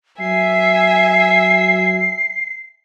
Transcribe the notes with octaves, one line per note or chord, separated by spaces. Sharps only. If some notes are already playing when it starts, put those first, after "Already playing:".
F#3 E5 G#5 C7